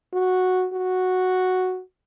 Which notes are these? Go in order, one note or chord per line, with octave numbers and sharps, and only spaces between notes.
F#4
F#4